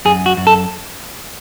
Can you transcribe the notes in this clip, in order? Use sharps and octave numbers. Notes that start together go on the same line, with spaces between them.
F#2 G#4
F#4
F#2
A4